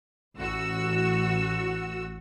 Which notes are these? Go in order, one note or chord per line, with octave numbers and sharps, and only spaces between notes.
A1 F#4 E6